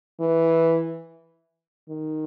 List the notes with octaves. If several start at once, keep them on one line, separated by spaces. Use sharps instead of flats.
E3
D#3